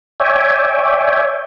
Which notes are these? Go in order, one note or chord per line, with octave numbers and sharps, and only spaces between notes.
C#5 D5 E5 G5 G#5